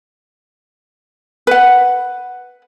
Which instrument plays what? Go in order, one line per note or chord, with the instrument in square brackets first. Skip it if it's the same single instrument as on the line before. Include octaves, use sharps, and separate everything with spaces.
[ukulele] B4 F#5